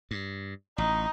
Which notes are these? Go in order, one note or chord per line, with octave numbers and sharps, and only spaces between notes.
G2
A1 D#4